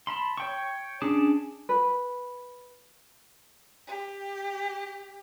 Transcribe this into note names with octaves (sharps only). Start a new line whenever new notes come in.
A5 B5 C6
C#5 G5 C#6
C#4 D4 G#4 A5 D6
B4
G4